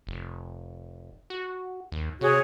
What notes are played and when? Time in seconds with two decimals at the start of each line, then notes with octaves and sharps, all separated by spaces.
0.07 F1
1.30 F#4
1.92 D#2
2.21 C3 F#4 G#4 C#5